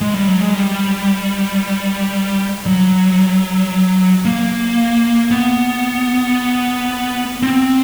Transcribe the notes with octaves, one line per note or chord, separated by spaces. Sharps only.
G#3
G3
F#3
G#3
G3
F#3
A#3
B3
C4